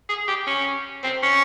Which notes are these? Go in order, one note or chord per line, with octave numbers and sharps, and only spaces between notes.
G#4
G4
C#4
C4
C#4